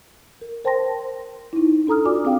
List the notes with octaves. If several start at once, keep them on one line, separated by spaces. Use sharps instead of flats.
A#4
A#4 C5 G5 A5 C6 A#6
D#4 E4
D4 A4 A#5 D#6 F6
F4 F#4 D5 G#5 D6
C4 G#4 F5 G5